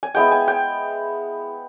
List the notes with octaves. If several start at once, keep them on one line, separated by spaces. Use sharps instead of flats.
G#5
G#3 B3 E4 G5
G#5
G5